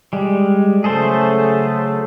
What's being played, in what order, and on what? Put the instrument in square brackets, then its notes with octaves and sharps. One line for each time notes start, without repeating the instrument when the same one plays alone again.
[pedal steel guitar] G3 G#3
[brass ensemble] C#3 F#3 A3 [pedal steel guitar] G#4 A4 C5